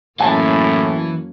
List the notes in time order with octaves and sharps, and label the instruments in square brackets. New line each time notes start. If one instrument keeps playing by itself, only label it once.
[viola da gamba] F#2 A#3 C#4 [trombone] A2 [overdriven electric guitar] E3 [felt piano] F#5 G#5 A5